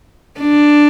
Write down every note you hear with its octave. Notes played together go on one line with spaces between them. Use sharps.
D4